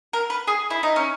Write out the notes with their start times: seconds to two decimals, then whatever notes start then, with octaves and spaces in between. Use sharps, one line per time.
0.13 A#4
0.30 B4
0.47 G#4
0.70 E4
0.83 D#4
0.96 C#4